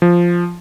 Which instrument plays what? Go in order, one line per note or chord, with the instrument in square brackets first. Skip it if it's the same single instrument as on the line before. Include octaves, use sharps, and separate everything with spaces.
[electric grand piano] F3